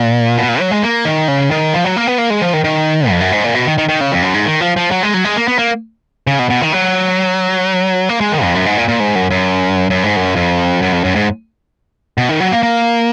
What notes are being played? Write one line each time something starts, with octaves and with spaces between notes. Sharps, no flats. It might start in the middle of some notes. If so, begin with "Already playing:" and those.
Already playing: A#2
B2
A#2
F#3
G#3
A#3
D#3
C#3
D#3
F3
F#3
A#3
B3
A#3
G#3
F3
D#3
D#3
F2
F#2
G#2
A#2
B2
D#3
D#3
D#3
C#3
F2
F#2
G#2
D#3
F3
F3
F#3
G#3
F#3
G#3
A#3
B3
A#3
C#3
B2
B2
D#3
F#3
A#3
G#3
D#3
F2
F#2
G#2
A#2
A#2
G#2
F#2
F#2
F#2
G#2
F#2
F2
F#2
F2
F#2
G#2
B2
D#3
F#3
A#3
A#3